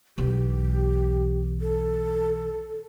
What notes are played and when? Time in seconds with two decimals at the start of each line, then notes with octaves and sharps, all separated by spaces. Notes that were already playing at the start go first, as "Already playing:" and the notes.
0.18 B1 E2 G4
1.61 A4